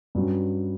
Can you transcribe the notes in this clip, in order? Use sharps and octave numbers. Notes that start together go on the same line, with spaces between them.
G2 F#3 C#4